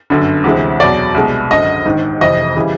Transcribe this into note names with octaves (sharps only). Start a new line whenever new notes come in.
G1 F#2 D3
D2 C3 E3 G#3
E2 B2 F#3 D5
C2 B2 G#3
G#1 F#2 D3 D#5
A#1 G#2 D#3
F1 F2 C3 E3 D#5
C#3 E3 G3